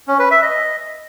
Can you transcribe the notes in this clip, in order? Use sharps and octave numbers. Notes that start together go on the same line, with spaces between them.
C#4
B4
E5
D#5